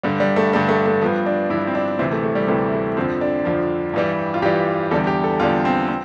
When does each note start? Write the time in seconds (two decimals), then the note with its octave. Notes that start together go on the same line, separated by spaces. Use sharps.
0.03 G2 D3 G3
0.20 G3
0.36 A3
0.53 G2 D3 G3 A3
0.69 A3
0.86 A3
1.01 G2 F3 B3
1.26 D4
1.50 G2 E4
1.54 F3
1.67 C4
1.75 D4
1.99 D2 C3 E3 C4
2.11 A3
2.23 A3
2.35 G3
2.48 D2 C3 E3 A3
2.73 A3
2.97 F2 D3 F3 C4
3.21 D4
3.45 F2 D3 F3
3.94 G2 E3 G3
4.34 F4
4.42 G2 E3 G3 G4
4.91 E2 D3 G3 A4
5.07 G4
5.24 A4
5.40 E2 D3 G3 F4
5.65 C4
5.89 C4